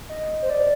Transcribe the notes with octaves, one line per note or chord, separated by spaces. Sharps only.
D#5
C5
D5